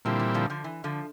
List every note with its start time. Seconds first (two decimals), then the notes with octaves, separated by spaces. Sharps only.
0.05 A#2 D3 F3 G3 C4 E4
0.20 E3
0.34 D3 F3
0.50 D3 F3
0.64 E3
0.84 D3 F3